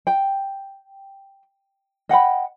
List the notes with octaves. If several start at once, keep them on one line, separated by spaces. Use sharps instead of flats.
G5
D#5 F#5 G5 B5